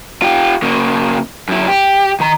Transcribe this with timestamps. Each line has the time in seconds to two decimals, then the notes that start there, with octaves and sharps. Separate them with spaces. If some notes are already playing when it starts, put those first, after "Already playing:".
0.22 F4 G4
0.62 C#3 A#3
1.48 F#2 E4
1.68 G4
2.20 D#3 A#5